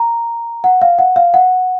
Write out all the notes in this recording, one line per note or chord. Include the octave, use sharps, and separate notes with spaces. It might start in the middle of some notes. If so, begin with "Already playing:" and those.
Already playing: A#5
F#5
F5
F#5
F5
F#5